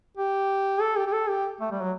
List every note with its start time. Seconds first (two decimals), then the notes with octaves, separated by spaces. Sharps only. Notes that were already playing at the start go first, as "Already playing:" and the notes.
0.17 G4
0.81 A4
0.97 G4
1.07 G4
1.13 A4
1.29 G4
1.61 A3
1.72 G3
1.81 F#3